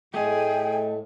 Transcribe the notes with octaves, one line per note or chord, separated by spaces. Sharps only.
A2 A3 G#4 D#5 G5